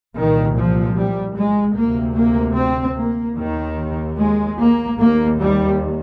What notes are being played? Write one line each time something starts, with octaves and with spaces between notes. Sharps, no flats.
C2 A#2 D#3
F3
G3
G#3
D2 C3 A#3
A#3
C4
A#3
D#2 D#3
G#3
A#3
D#2 A#3
G3